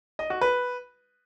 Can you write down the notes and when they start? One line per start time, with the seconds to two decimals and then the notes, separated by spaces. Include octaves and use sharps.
0.19 D#5
0.30 F#4
0.41 B4